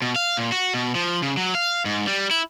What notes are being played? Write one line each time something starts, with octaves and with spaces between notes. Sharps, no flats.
B2
F5
A#2
F#4
B2
F3
C#3
F#3
F5
G#2
G3
E4